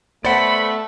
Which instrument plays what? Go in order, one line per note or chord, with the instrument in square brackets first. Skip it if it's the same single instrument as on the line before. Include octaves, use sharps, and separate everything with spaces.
[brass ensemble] A3 [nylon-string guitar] B3 C5 [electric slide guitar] D5 F#5 [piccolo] B5